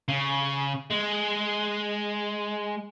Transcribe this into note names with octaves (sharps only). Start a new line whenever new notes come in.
C#3
G#3